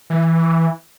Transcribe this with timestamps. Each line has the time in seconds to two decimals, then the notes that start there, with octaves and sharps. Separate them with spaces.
0.10 E3